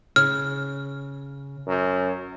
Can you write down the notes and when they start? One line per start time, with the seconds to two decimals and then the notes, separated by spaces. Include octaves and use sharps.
0.16 C#3 C#5 F6
1.67 F#2